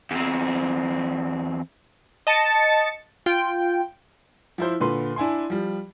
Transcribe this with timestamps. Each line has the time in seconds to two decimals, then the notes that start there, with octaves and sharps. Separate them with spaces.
0.11 E2 C4
2.27 D#5 A5 A6 C#7
3.26 F4 G5
4.58 F3 E4 C5
4.80 A#2 D3 B4 C6
5.16 D4 E4 G#5 C6
5.50 F3 G3